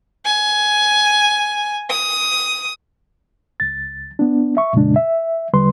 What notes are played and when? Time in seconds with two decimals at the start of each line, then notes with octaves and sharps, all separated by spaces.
0.25 G#5
1.90 D#6
3.60 C#2 A6
4.19 B3 D4
4.57 E5 C#6
4.73 F2 A#2 C#3 G#3 D4
4.96 E5
5.53 E2 D3 G3 B4 C6